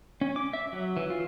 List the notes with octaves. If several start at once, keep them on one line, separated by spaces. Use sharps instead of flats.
C#4
D6
E5
F#3
E3
F4